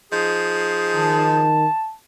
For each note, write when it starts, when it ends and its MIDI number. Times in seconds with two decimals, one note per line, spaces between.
0.12 1.53 53
0.12 1.53 63
0.12 1.53 68
0.96 1.66 51
0.96 1.96 81